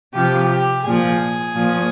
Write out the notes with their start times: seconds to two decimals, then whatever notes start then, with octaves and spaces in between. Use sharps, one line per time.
0.13 C3 F3 G4
0.49 G4
0.84 A#2 F3 G#4
1.54 A#2 F3